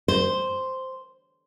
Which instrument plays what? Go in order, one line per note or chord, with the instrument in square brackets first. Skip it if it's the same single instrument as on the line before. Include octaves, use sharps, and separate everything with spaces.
[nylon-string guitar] C5